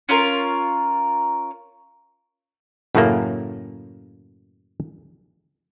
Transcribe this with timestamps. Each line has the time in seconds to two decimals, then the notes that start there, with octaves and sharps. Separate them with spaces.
0.09 C#4 F4 A#4
2.95 F#2 A2 C#3 A3 A#3